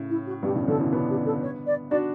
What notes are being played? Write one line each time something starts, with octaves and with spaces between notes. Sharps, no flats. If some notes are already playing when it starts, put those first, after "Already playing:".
Already playing: A2 C#3
E4
F#4
G2 B2 G4
A2 C#3
B2 D3 A4
C#3 E3
B3 D4 F#4
G4
A4
C#5
D5
D4 F#4 D5